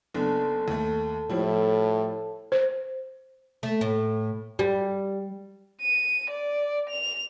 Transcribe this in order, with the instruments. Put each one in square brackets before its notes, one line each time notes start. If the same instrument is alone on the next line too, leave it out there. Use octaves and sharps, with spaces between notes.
[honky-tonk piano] F#1 B3 D4 [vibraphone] A4 A5
[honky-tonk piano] D#2 A3
[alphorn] A2 [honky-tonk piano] F3 G3 E4
[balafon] C5
[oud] A3
A2
G3
[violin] D#7
D5
F7